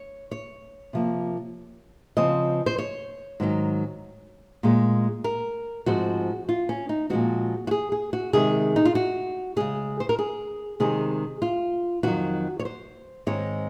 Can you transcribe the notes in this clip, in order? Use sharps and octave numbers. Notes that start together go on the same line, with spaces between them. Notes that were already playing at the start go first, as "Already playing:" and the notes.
Already playing: C#5
C#5
C3 F3 A#3
C#3 F3 C4 D#5
C5
C#5
G#2 D#3 F#3 C#4
A#2 G#3 C#4
A#4
G#2 F3 G#3 C4 F#4
F4
C#4
D#4
A#2 F3 G#3 C4 F#4
F#4
G#4
G#4
F#4
C3 D#3 G#3 C4 G#4
D#4
F4
F#4
C#3 G#3 C#4 G#4
C5
A#4
G#4
C3 D#3 G#3 C#4 G#4
F4
F2 D#3 F#3 F#4
C#5
C5
G#2 D#3 G#3 C4 C#5